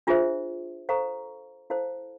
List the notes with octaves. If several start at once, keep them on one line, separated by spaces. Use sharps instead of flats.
D4 F4 G#4 C5 E5
A4 C5 F5 A#5 C#6
E4 A4 C5 F5 A5